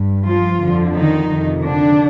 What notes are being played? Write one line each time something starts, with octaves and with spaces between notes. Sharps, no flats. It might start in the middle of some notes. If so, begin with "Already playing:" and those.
Already playing: G2
F3 F4
F2 D3 F3
D#3 D#4
F2 C3 D#3
D3 D4